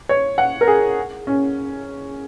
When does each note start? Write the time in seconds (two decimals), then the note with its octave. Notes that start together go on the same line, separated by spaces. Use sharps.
0.09 C#5
0.38 F#5
0.61 A#4
0.68 G#4
1.27 C#4